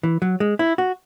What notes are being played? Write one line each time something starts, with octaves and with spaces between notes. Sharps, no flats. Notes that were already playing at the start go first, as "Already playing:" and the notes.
E3
F#3
G#3
E4
F#4